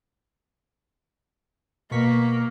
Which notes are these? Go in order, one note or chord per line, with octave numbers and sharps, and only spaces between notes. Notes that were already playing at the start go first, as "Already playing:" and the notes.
B2 A#3 C#6 B6